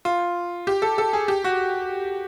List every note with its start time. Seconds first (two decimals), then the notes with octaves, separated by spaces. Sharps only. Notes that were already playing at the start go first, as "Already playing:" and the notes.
0.05 F4
0.67 G4
0.82 A4
0.98 A4
1.13 G#4
1.28 G4
1.44 F#4